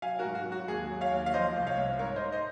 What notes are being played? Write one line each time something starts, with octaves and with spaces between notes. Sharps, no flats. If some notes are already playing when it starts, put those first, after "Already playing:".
F#3 F5 G#5
F#4 A#4
G#2
F#4
F#3
F#4
D#2 G#4
F#3
C#5 F5
D#2
F5
F3 C5 D#5
C2
C#5 F5
C2
G#2 A#4 C#5
C5 D#5
G#2
C5 D#5